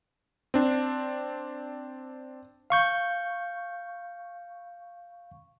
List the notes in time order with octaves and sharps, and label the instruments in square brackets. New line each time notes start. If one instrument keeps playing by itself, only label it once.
[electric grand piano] C4 D4
[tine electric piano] F5 C#6 G6